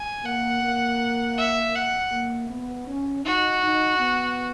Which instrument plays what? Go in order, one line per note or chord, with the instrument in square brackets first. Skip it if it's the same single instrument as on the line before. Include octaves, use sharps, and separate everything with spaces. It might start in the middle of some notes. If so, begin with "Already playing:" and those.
Already playing: [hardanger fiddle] G#5
[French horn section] A#3 [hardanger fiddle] F#5
[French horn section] A#3
[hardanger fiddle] E5
F#5
[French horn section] A#3
B3
C#4
[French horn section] D#4 [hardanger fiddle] F#4
[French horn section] D#4
B3